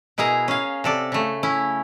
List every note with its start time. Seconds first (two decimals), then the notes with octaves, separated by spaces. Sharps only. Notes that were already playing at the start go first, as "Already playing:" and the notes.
0.18 B2 E4 G#4 A#4 A#5
0.48 C#4 F5
0.84 C3 A4 D5
1.12 C#3 A3
1.43 C#4 E4